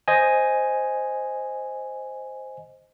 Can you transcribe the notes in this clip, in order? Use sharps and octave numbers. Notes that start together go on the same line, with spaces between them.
C5 D#5 G#5